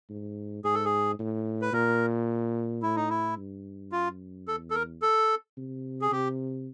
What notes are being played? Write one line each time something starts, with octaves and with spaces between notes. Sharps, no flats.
G#2
G#2 G#4
A4
G#4
A2
B4
A#2 A#4
A2 E4
D#4
E4
G2
F#2 F4
E2 A4
A4
A#4
A4
C3
G#4
C3 G4